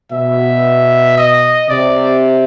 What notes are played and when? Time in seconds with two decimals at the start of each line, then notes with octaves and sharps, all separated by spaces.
0.12 B2 E5
1.17 D#5
1.69 C3 D5